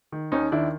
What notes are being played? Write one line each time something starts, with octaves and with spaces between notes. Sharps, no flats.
D#3
D#2 C#4 D#4
D#3 D4 E4